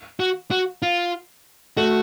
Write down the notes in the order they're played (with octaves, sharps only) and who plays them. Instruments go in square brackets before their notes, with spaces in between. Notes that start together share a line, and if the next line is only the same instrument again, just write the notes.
[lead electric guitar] F#4
F#4
F4
[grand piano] A3 [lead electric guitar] F#4